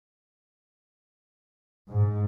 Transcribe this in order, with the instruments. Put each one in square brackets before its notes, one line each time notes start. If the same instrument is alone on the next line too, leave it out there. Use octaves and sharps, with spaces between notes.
[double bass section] G#2